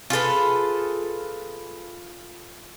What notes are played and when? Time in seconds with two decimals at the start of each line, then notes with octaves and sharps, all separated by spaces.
0.10 F4 G#4 A4 B4